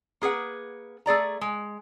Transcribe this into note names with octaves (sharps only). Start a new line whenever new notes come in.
A#3 G#4 B4 F#5
A3 G#4 D5 A#5
G#3